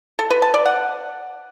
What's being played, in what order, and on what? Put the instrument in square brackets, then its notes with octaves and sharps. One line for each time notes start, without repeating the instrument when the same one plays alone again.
[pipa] A4
B4
A5
D5
F#5